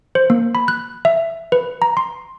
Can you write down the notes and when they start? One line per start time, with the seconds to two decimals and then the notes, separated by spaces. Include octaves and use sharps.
0.15 C5
0.30 A#3
0.55 B5
0.68 F#6
1.05 E5
1.52 B4
1.82 A#5
1.97 C6